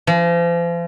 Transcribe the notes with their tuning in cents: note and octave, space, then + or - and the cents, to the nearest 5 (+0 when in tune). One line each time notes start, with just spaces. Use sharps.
F3 -40